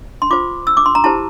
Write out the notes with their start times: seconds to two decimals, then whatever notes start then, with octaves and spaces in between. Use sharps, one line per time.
0.22 C6
0.31 F4 C5 D6
0.67 E6
0.77 D6
0.86 C6
0.95 A#5
1.04 E4 G4 C5 A5